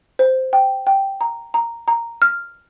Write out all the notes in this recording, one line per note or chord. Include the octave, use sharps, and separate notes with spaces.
C5
G5
G5
A#5
A#5
A#5
F6